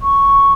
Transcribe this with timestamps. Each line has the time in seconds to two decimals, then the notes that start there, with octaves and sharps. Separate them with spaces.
0.01 C#6